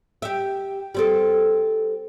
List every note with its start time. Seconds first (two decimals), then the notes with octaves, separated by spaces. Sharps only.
0.22 G4 E5
0.95 G3 C4 A4